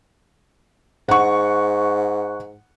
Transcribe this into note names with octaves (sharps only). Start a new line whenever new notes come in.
G#2 F#5 C#6